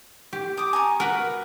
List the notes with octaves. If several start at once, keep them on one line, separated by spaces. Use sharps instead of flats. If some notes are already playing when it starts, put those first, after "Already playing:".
G4
D6 D#6
G#5 A#5 C#6
F#4 A#4 B4 F#5